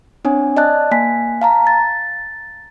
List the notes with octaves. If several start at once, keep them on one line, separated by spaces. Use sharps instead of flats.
C4 D4 C#5 G#5
D5 D#5 A5 F#6
A#3 G#5 B6
F5 A5 A#5
A6